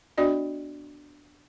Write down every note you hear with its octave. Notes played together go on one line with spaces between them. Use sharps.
B3 D4 F#4 D5 D#5